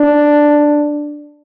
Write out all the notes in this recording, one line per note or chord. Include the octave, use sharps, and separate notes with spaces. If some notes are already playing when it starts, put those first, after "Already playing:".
Already playing: D4